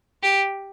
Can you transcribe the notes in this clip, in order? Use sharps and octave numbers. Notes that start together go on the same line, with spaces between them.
G4